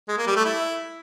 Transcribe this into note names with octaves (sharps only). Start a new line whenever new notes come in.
G#3
A#3
G3
A3
E4